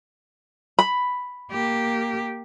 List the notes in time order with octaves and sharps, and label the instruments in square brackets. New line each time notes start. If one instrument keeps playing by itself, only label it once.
[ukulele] B5
[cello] A#3 G4